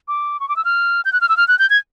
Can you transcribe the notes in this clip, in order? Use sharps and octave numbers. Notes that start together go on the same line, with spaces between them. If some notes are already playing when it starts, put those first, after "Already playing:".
D6
C#6
D6
E6
F6
G6
F#6
F6
E6
F6
F#6
G6
G#6